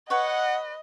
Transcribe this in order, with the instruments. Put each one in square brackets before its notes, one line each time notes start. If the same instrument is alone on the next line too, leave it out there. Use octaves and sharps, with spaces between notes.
[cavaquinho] B4 C#5 [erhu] D#5 [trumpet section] F#5